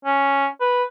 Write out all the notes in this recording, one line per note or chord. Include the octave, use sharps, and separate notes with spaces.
C#4
B4